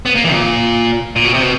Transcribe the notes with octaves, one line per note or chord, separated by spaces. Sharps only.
B3
A#3
E3
A#2
A#2
B2
C3
B2